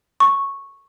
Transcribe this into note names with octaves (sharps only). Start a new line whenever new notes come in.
C#6